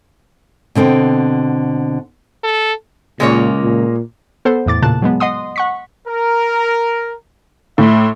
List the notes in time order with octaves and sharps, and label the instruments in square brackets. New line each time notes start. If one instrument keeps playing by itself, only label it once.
[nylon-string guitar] B2 D3 C4 G5
[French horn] A4
[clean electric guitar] C#2 [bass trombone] A#2 [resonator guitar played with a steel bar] G#3 A#3 C#5
[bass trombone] A#2
[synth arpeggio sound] B3 A4 C5 F#5
E2 A2 D6 A6
A#2 C#3 A5 F#6
F#3 G#3 B3
D#5 F#5 C6 D#6
F#5 C#6 B6
[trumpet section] A#4
[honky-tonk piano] A2 [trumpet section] E5 B5 C6